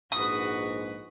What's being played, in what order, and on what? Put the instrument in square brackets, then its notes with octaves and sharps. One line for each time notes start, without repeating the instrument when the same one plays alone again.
[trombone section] A#1 G#2 [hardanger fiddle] F#4 B4 [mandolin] D#6